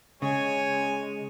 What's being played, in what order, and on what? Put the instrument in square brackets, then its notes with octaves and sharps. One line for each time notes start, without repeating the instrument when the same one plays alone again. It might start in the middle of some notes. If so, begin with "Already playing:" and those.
[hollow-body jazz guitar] C#3 [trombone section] G#3 [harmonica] C#5 G#5